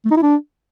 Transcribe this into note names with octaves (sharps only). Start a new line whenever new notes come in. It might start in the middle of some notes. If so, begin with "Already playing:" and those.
A3
D#4
E4
D4